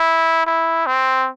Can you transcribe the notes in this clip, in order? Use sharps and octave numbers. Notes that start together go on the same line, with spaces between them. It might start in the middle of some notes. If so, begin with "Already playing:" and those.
Already playing: E4
E4
C4